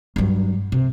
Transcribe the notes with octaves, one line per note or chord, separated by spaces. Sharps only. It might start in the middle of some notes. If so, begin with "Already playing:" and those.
G2 F#3
C3